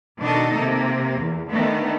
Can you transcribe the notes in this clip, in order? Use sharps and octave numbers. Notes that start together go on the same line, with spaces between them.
B2 D#3 D4 D#4 A4 D#5
C3 A#3
E2
D3 D#3 A3 B3